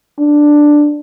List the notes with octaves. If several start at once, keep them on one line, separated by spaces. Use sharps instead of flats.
D4